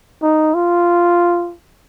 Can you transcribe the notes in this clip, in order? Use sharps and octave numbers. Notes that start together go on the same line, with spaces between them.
D#4
F4